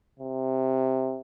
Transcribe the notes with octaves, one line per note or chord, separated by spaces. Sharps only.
C3